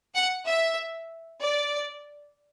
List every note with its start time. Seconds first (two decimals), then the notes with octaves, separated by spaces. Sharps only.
0.14 F#5
0.46 E5
1.41 D5